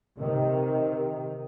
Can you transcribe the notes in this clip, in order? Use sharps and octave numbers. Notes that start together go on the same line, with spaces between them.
C3 D#3